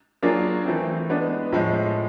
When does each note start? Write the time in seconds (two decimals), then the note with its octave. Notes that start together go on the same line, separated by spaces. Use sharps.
0.23 F#3 A#3 D4 F4 G#4
0.65 E3 A3 C4
1.09 G#3 B3 D4
1.52 A2 F3 G#3